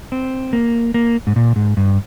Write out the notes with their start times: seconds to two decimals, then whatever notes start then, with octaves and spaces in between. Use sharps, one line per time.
0.12 C4
0.53 A#3
0.94 A#3
1.27 G#2
1.36 A#2
1.56 G#2
1.77 G2